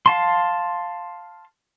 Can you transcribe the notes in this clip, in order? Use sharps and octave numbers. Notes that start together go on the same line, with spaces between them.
F5 A5 C6